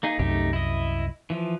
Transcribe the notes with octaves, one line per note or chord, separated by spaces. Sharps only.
A#3 D#4 G#4
C2 F#2 A3 D#4 G4
E4 D#5
E3 F3